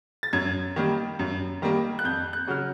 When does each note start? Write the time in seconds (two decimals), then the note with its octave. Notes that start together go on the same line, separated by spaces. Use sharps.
0.23 A6
0.33 F#2 G#6
0.76 D#3 G3 A#3
1.19 F#2
1.62 D#3 G3 A#3
1.99 F#6
2.04 F2 G6
2.33 F#6
2.48 C#3 F#3 F6